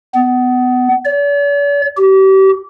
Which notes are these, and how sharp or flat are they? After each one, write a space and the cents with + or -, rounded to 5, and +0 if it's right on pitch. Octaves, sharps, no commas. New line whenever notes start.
B3 +25
D5 -45
G4 -35